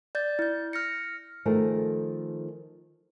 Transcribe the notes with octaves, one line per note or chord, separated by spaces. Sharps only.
D5 G6 A6
E4 G6
F6 A#6 C#7
D#3 F3 A3 G#4 A#4